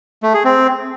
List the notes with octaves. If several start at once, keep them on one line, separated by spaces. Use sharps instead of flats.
A3
G#4
C4